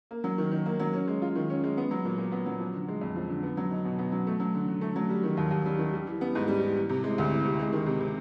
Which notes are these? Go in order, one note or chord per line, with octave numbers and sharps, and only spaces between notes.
A#3
F#3
D#3
D#3
A#3
F#3
C#4
G#3
F4
D#3
C#4
G#3
B3
F#3
A#2
A#2
B3
F#3
F3
D3
G#3
F2
F3
D3
B3
F#3
D#4
B2
B3
F#3
A3
F#3
D3
D3
A3
F#3
G3
D#3
D#2
D#2
G3
D#3
G3
E3
B3
G#2
G3
E3
E3
C3
G#3
D2
E3
C3
G#3
D#3
C3
C3